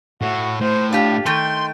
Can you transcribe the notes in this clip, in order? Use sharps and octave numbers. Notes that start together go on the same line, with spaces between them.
A2 F#4
A2 C5
D4 F4 G4
D#3 A3 G5 C6